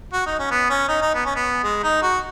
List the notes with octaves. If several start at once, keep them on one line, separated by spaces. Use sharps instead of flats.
F#4
D#4
C#4
B3
C#4
D#4
D#4
B3
C#4
B3
G#3
D#4
F#4